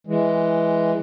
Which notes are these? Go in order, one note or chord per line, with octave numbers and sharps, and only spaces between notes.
E3 G#3